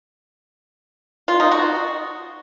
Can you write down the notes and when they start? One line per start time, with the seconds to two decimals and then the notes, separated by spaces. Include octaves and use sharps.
1.28 F4
1.40 D#4
1.51 F#4